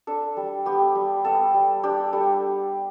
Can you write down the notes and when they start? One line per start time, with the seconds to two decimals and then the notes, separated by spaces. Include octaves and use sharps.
0.07 D4 A4
0.37 G3
0.66 B3 G4
0.95 G3
1.25 B3 A4
1.54 G3
1.83 D4 G4
2.13 G3 A4